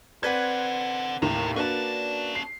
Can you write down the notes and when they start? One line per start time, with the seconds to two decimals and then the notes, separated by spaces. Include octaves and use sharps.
0.23 C4 A4 B4 D5 F#5 G#6
1.22 D#2 A2 C3
1.56 A#3 C#4 D4 F#4 B4 D5 A5
2.35 C7